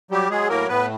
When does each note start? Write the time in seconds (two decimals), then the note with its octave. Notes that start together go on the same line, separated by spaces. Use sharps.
0.11 F#3 G3 G4
0.30 F#3 G#3 G#4
0.49 A2 A#3 A#4
0.69 A2 B3 B4